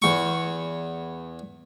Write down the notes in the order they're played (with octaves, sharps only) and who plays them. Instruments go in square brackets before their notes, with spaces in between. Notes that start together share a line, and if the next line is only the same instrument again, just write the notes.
[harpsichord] E2 C#6